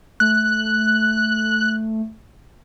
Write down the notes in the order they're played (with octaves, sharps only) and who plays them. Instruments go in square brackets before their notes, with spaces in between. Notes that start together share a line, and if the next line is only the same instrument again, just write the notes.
[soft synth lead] A3 [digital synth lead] F#6